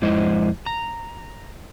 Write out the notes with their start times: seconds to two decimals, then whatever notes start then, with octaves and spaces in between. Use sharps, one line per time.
0.02 F2 G#3 E4 C5 D#5
0.66 A#5